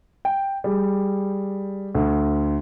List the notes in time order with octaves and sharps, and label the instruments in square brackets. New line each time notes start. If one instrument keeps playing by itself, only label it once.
[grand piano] G5
G3 G#4
D2